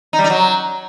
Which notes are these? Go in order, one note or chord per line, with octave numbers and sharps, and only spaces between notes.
D#4
G3
D#4
F#3